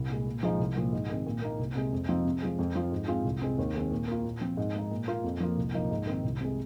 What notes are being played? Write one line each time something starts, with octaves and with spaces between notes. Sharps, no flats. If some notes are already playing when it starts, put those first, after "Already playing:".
Already playing: C2
A#2 G#3
A#2
F3 G#3 D#4
C2
A#2 F3
G#2
D#3 G#3 C4
A#2
A#3 D#4
C2
C3 G#3
F2
F3 C4 D#4
C3
F3 G#3
F2
F3 C4 F4
G#2
G#3 C4 F4
C2
C3 G#3 C4
D#2
D#3 G#3 C4
A#2
A#3 F4
A#2
F3 C4
G#2
G#3 D#4
A#2
A#3 F4
F2
F3 A#3 F4
C2
A#2 F3 A#3 D#4
G#2
D#3 C4 D#4
C2
C3 G#3